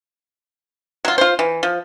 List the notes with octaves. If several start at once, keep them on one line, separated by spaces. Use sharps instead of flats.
F#3 F4
F4 C5
E3
F3